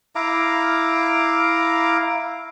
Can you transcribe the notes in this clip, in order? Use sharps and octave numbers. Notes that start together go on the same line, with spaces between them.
E4 F5 A#5 D6